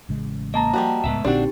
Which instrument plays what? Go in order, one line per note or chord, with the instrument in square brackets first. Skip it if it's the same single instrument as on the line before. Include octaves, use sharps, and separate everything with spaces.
[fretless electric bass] A1 C#3 G#3
[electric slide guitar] A#3 [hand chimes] D#5 A5 A#5
[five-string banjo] F3 G3 F#4
[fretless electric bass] D1 C#2 A2 [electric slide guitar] G#3 B3 E5
[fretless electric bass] A#1 A#2 D3 [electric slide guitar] C4 [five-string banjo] D4 F#4 [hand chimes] D#4 G4